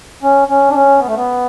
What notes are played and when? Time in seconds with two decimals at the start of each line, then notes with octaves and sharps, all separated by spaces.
0.23 C#4
0.48 C#4
0.69 D4
0.73 C#4
0.99 B3
1.07 A3
1.15 B3